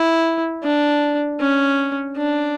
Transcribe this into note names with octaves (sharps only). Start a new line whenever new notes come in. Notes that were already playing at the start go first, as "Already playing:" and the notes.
Already playing: E4
D4
C#4
D4